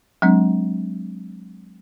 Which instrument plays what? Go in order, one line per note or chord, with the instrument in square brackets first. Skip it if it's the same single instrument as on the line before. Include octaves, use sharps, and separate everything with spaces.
[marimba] F#3 G#3 C4 D4